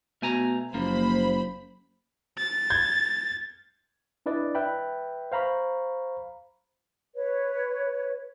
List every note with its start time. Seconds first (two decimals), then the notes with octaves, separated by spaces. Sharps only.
0.22 B2 A3 G#5 A#5
0.74 F#1 F3 A#3 C5 B5
2.38 A6
2.70 G6 G#6
4.26 D4 E4 B4 D5 D#5
4.55 B4 E5 G5 B5
5.32 C5 F5 A#5 B5 C#6
7.15 B4 C#5